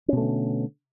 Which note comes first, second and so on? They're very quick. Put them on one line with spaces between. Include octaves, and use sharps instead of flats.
C#4 B2 A3 D3